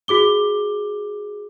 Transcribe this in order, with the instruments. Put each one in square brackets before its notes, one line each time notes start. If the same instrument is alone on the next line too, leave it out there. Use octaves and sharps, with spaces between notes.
[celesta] F#4 G#4 D6 G7